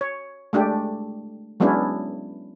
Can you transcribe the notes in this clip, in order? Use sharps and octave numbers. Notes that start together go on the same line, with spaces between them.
C#5
G#3 A3 D4 G4
F#3 G#3 B3 C#4 D4 E4